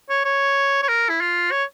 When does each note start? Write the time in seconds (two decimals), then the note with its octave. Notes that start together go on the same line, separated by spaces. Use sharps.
0.09 C#5
0.25 C#5
0.82 C#5
0.88 A#4
1.09 E4
1.21 F4
1.51 C#5